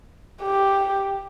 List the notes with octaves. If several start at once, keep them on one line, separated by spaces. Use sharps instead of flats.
G4